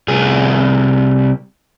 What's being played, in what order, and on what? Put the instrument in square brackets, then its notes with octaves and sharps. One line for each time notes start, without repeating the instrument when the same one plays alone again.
[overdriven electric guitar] C2 G#4